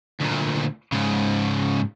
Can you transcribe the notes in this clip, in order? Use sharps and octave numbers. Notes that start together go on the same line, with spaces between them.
D2 A#2
G#2 C#3